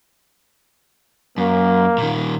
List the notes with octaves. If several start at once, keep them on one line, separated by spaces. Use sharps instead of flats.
F#2 A#3
A#2 D#3